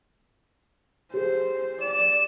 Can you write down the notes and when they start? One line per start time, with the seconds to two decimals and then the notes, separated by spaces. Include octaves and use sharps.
1.14 G4 G#4 C5
1.81 D5 E7